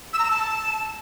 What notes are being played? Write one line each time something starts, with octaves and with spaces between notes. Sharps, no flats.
E6
A#5
E6
A5